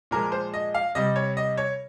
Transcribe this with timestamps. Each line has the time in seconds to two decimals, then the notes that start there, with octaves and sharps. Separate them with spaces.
0.11 A#2 F3 G#3 A#4
0.32 C5
0.54 D#5
0.75 F5
0.95 C3 G3 D#5
1.16 C#5
1.37 D#5
1.57 C#5